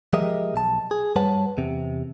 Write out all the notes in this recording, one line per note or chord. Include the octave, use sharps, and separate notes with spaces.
F3 G#3 G4 A#4 D#5 E5
B1 A5
G#4
G2 G3 B4 C#5 F#5 A5
E2 C3